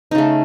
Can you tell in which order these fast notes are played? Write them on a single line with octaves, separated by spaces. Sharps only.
D#4 C#3 A3